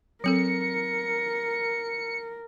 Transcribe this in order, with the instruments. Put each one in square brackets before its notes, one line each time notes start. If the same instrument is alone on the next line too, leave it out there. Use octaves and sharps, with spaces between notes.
[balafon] F#3 C4 A4 [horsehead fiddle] A#4 [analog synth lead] C#7